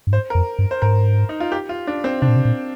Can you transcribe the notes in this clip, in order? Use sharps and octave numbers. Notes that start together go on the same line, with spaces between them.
G2
G#2 C5
A#4
F2
G2
C5
G#2 A#4
D#4
F4
G4
F4
D4
C4
C3 D4
A#2
C3
A#2